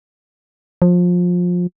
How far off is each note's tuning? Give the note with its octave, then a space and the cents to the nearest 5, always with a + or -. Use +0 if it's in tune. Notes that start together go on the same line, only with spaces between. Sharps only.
F3 +25